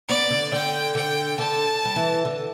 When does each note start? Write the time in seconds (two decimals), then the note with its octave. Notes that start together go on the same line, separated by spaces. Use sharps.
0.09 B3 D5
0.31 D3
0.52 D3 G5
0.95 D3 G5
1.38 D3 A5
1.85 G3
1.96 E3
2.25 D3